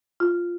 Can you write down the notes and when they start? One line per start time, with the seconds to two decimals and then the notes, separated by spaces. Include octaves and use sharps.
0.20 F4